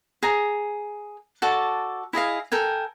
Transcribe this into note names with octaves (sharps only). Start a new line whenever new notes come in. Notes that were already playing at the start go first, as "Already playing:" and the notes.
G#4 A#5
F#4 A4 D5 A5
E4 G#4 D#5 F5
A4 A#4 G5 G#5